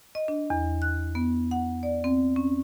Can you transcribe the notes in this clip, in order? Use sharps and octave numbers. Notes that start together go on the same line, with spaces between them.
D#5
D4
E2
F#6
B3
F#5
D5
C4
C#4